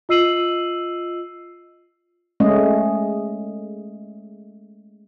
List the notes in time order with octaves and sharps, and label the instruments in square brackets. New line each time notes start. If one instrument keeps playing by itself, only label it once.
[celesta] F4 D#5 E6 C7 D#7 F#7
[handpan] G#3 A3 C#4 D#5